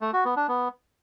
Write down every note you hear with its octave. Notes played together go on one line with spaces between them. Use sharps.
A3
F#4
B3
D4
B3